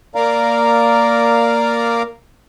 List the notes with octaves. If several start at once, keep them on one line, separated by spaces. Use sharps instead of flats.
A#3 A#4 D5 F5 A#5